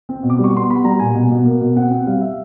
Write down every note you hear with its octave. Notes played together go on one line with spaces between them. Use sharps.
C4
B2
D6
G3
C#6
B3 C6
B3 B5
G3 A#5
A#2 G#5
B2
B2
A#3
B2
C4 F#5
C4
G3 F5
E5